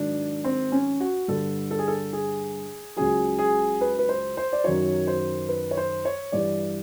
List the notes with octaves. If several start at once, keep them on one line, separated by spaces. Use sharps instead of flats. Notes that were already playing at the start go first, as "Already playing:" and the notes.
Already playing: G#2 D#3 F#3 D4
C4
C#4
F#4
G2 D3 G3 A4
A4
G#4
A4
G#4
C#2 C#3 F#3 G#4
G#4
B4
B4
C5
C5
D5
F#2 D#3 F#3 C#5
C5
B4
C#5
C5
C#5
G2 E3 G3 D5